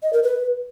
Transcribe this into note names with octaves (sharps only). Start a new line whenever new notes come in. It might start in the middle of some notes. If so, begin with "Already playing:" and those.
D#5
A#4
B4